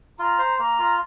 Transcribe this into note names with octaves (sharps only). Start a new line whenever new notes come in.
F4 A#5
C5
A#3 A#5
F4